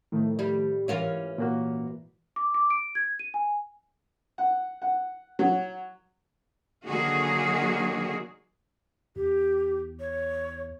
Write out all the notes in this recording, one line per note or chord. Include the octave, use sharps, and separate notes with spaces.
A2 D#3 F3 A3
G3
G#2 E3 C#4 F4 A#4
A#2 A#3 F#4
D6
D6
D7
G#6
D#7
G#5
F#5
F#5
F#3
D3 D#3 F#3 A#3 F#4 G#4
E2 G4
C#5